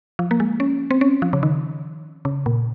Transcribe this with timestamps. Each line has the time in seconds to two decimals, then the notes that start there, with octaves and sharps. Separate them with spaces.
0.19 F3
0.31 A#3
0.40 G#3
0.60 C#4
0.91 C4
1.01 C#4
1.22 F3
1.33 C#3
1.43 D#3
2.25 C#3
2.46 A#2